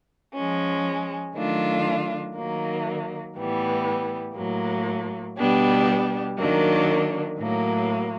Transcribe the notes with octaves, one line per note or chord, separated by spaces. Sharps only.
F3 G#3 C#4
D#3 F#3 A3 D4 F4
D#3 F#3 A#3
A2 E3 G3 B3
A2 F#3 A#3
B2 G3 B3 D4 G4
D#3 F#3 A#3 D4
A2 F#3 A#3